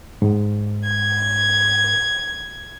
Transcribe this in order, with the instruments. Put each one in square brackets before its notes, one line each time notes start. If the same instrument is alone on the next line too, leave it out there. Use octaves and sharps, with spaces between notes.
[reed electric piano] G#2
[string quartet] G#6